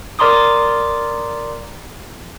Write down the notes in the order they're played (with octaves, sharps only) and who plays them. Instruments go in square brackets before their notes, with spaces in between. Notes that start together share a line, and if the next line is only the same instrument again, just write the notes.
[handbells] A#4 D5 A#5 C6 D6 D#6